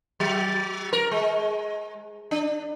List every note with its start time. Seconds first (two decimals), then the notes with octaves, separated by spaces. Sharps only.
0.20 F#3
0.93 A#4
1.11 G#3
2.31 D4